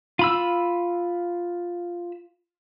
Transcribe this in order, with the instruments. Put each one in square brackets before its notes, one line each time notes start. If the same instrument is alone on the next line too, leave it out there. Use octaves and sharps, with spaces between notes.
[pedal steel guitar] F4 B5 E6